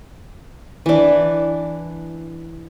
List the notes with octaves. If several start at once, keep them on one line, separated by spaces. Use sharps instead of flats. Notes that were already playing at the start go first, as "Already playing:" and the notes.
E3 D4